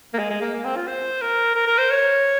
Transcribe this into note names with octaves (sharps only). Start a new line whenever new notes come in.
A#3
G#3
G#3
A#3
A#3
C4
F4
C5
A#4
A#4
A#4
C5
C#5